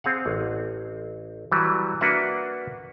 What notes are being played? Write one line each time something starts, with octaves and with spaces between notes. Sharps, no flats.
C4 G#4 F5 F#5
A1
E3 F#3 G3
A#3 D4 F#4 B4 E5 F#5